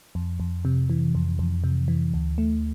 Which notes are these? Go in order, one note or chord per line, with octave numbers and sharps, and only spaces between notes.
F2
F2
C3
E3
F2
F2
C3
E3
D2
A3